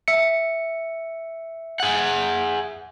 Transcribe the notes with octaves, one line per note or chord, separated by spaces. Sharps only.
E5 C#7
G#4 F#5